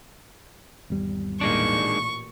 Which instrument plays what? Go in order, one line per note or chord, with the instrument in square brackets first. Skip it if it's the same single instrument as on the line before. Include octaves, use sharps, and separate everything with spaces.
[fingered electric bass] G#1 E2 G3
[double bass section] A1 A#2 [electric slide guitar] D#3 G#3 D4 [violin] C#6